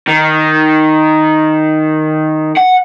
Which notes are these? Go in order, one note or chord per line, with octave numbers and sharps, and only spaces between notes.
D#3
F#5